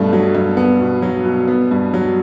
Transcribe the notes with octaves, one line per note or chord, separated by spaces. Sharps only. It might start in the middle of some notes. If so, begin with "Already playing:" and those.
Already playing: G2 B2 A3
F#3
G2
B3
B2
F#3
B2
B3
G2
F#3